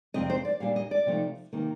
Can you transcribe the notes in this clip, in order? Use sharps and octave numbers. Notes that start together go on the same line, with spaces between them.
F2 C3 G3 C4 D#5
C5
D5
A#2 G3 D4 F5
D#5
D5
C3 F3 A3 D#4
C3 D#3 A#3